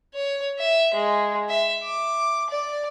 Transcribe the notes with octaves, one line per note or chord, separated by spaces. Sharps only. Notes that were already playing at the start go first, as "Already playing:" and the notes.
C#5
E5
G#3
E5
D6
D5